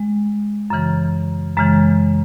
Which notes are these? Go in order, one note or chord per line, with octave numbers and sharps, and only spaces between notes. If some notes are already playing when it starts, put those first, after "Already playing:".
Already playing: G#3
F#2 C#3 E3
F#2 C#3 E3 G#3